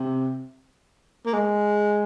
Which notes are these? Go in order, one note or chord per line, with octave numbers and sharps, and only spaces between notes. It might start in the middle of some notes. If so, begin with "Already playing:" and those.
Already playing: C3
A#3
G#3